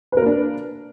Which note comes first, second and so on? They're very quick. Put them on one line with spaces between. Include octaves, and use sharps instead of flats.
B4 A#4 A#3 D4